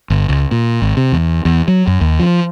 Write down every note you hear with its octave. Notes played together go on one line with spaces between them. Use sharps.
G1
C#2
A#2
G#1
C3
E2
E2
F#3
F#2
D#2
F3